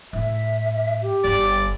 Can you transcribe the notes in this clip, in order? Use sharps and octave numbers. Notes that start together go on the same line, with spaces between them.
A2 E5
G4
G1 D5